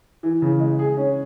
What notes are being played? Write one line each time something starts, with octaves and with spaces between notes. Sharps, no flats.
E3
C#3
G#3
G#4
C#4